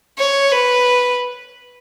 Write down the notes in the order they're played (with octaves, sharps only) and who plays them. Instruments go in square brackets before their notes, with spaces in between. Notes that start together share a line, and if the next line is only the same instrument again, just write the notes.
[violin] C#5
B4